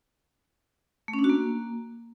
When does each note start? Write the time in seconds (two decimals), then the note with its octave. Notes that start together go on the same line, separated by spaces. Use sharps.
1.08 A3
1.14 C#4
1.19 D4
1.24 F#4
1.29 A#3